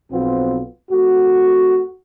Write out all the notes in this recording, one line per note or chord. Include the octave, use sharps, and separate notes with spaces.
B1 F3 B3 C4 F4
F2 A3 F#4